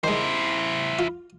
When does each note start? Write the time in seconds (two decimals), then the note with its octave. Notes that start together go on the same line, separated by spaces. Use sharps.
0.04 D#3 G#3 E4 C5
0.99 F4